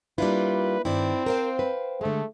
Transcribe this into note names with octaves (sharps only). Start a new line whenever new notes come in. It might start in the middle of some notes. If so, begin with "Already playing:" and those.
G3 A#3 D4 E4 F4 B4
G2 D#3 C4 E4 D5
A#4 C5 F5 G5
B4
D3 G#3 A3